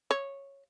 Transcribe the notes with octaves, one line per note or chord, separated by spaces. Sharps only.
C#5